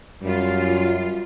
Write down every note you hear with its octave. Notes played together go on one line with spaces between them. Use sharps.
F#2 G3 F4